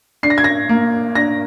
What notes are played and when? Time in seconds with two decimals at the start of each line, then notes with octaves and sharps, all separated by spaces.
0.23 D4 C7
0.30 A#6
0.38 G#6
0.44 A#6
0.69 A#3
1.15 D4 A#6